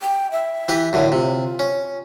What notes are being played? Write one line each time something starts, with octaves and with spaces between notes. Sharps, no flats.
G5
E5
E3 G4 B4
F#2 A2 D3
C3 F4
C#4